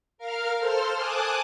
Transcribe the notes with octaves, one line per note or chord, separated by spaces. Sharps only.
A#4 F5 F6
A4 C5 C6 F6
G#5 A5 D6 D#6 F#6